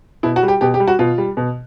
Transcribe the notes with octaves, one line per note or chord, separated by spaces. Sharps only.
B2 E4
F#4
G3
G4
B2 G4
G4
G3
F#4
B2 F4
G3
B2